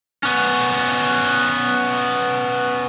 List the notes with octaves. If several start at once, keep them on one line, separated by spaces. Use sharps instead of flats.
B3 C#4